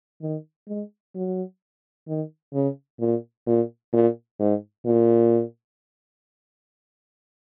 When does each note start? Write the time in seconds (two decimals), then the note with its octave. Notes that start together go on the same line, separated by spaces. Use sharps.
0.22 D#3
0.68 G#3
1.15 F#3
2.08 D#3
2.54 C#3
3.00 A#2
3.47 A#2
3.93 A#2
4.40 G#2
4.86 A#2